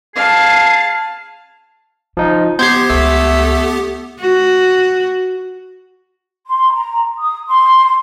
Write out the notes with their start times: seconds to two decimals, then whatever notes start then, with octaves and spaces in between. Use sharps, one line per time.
0.16 G#4 F5 A5
2.17 C#3 F3 D#4
2.59 B3 G4 C5 G6 G#6 C7
2.90 C#2 A3
4.20 F#4
6.46 C6
6.73 A#5
7.19 D#6
7.47 C6